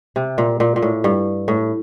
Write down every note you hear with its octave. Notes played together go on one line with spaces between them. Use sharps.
C3
A#2
A#2
A#2
A2
G2
A2